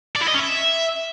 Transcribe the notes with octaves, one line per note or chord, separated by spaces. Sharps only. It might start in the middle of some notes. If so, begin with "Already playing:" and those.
D5
E4
D#5
C#4
E5